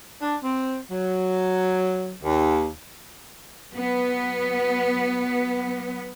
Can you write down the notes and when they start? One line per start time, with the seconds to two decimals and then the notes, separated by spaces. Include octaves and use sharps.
0.21 D4
0.44 C4
0.90 F#3
2.23 D#2
3.71 F#3 B3